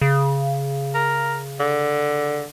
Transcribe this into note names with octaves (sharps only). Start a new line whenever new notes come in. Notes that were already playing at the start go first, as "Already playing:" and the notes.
C#3
A#4
D3